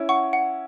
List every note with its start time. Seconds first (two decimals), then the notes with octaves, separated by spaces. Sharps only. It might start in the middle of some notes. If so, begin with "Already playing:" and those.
Already playing: C#4 E4
0.09 F#5 C#6
0.33 F#5